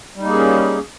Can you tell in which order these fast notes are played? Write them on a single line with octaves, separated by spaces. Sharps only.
G3 D#4 A#3 G#4 C#4